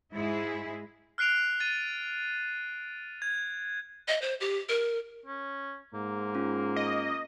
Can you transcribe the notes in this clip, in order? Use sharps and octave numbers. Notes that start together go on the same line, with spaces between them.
G#2 G#3 E4 G#4
F6 F#6 C7 D7 F7
A6 D#7
G#6
D#5
C5
G4
A#4
C#4
G#2 A#3
C#4 F4
D#5